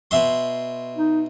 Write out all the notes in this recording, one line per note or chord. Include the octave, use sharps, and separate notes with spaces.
B2 E5 C6
D#4